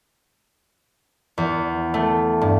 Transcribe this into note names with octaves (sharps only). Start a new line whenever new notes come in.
E2
A3
G2